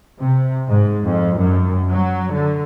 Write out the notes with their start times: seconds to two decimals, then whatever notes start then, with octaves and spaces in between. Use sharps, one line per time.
0.20 C3
0.68 G#2
1.04 F2
1.40 F#2
1.90 F#3
2.32 D3